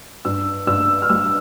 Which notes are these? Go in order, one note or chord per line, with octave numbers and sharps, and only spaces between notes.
G2 E6
G2 E6
F6
G3 E6